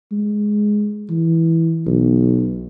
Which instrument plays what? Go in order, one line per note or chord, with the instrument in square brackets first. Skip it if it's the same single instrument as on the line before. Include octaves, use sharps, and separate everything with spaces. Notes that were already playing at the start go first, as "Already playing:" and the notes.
[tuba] G#3
E3
B1